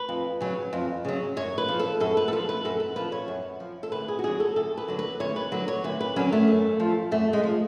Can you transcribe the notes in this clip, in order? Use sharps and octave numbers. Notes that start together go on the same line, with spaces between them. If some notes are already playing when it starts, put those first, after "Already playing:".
Already playing: B4
F2
C#3 F#3
F2
C#3 F#3
F#2 C#5
B4
F3
A4
F#2 A4
B4
A4
F3 B4
B4
F#2 A4
B4
F3 B4
C#5
F#2
F3
A4
D2 B4
G#4
F#4
D3 F#3 G#4
A4
D2 A4
B4
D3 F#3
B4
D2 C#5
B4
D3 F#3 B4
C#5
D2 B4
B4
D3 F#3 C#4
A3
F#2
F3
F#2 A3
G#3
F3